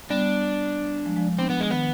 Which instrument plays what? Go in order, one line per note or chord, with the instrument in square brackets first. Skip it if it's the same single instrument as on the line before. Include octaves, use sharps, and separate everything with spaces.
[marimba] G3 B3 [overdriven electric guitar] D4
[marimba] F3 G#3
F3 G#3
[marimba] B3 D4 [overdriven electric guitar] C4
[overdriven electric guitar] B3
G#3
[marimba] D#3 [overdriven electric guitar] B3